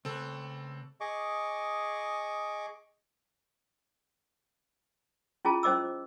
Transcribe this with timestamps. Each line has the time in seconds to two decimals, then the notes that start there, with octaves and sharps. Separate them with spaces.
0.05 C#3 C4 A4 B4
1.01 G#4 D#5 C#6 D6
5.45 C#4 E4 F4 G#4 A5
5.63 C#4 C5 D#5 D6 E6